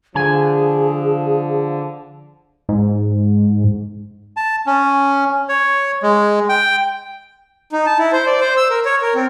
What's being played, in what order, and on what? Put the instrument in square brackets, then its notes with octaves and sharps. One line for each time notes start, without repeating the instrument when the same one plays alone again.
[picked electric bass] D3 [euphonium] F3 [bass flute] G#4 [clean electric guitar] G#5
[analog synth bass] G#2
[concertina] A5
C#4
C#5
G#3
G5
[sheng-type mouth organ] D#4
A5
E4
C5
D5
C5
E6
A#4
C#5
A#4
C4